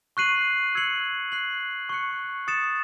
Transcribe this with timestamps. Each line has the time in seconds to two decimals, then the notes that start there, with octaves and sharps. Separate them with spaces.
0.17 C#6 F#6 C7 D#7 F#7
0.75 E6 G#6 C#7 F#7
1.32 F#6 C7 F#7
1.89 C#6 F#6 C#7
2.48 D#6 A6 C#7 E7